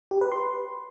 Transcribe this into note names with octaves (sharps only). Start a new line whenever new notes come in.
G4
B4
C6